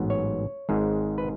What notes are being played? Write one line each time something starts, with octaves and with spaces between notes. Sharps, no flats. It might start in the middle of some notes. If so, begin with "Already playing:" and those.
Already playing: A1 G#2 F#3 B3
C#5
G#1 G#2 G#3
B4